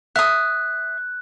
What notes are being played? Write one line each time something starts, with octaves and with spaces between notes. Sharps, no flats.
E5 D#6 F#6